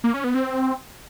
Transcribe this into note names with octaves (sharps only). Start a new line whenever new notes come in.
A#3
C#4
B3
C4